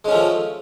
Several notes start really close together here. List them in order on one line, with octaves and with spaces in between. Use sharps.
G#3 C#4 A3 F3